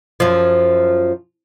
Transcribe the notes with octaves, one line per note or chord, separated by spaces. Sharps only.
F#2 F3